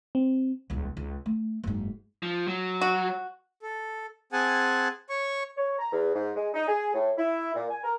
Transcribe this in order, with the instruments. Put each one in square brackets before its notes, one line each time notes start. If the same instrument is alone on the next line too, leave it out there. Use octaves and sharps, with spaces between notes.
[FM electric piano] C4
[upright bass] D#1 C#2
C#2
A3
F#1 G#2
[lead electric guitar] F3
F#3
[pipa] F#4
[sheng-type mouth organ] A4
C4 G#4 F#5 G#5 A5
C#5 C#6
[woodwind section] C#5
A#5
E2
G#2
G#3
D#4
G#4
A2
E4
A#2
G#5
A#4